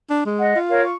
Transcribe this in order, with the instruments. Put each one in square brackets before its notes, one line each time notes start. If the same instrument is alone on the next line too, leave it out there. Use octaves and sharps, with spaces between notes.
[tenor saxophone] D4
G#3
[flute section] D#5 F#5
[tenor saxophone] F4
[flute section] A#4 C#5 F5
C#6